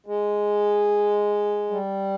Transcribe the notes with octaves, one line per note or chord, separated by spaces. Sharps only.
G#3
G3